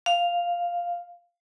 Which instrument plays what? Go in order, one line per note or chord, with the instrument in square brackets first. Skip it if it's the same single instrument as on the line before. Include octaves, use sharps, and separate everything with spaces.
[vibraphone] F5